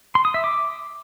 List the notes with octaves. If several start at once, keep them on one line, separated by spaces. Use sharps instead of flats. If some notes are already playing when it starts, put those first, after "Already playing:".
C6
D#6
E5
D6